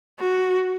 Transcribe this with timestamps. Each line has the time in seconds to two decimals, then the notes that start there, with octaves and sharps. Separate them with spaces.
0.19 F#4